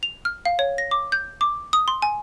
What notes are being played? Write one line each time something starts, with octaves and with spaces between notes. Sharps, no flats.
F7
F6
F5
C#5
A#6
D6
G6
D6
D#6
C6
G#5